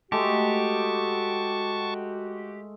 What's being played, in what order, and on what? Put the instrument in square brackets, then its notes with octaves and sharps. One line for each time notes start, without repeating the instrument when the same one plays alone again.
[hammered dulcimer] G#3 A3 [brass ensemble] F#4 [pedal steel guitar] G4 [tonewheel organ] A5 C#6